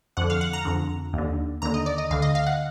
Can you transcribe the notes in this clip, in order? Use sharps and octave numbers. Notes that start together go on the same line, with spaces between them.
F2 D3 F#5
F5
F#5
A#5
F2 D3
D#2 D3
D#2 D3 A#5
D#5
D5
D#5
D2 D3 F5
D#5
F5
F#5